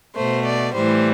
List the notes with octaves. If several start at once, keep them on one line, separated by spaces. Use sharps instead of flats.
B2 A3 C5
D5
A2 E3 G3 C5